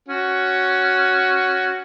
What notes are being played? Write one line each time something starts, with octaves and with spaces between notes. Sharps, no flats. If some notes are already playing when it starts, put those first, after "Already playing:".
C#4 F#4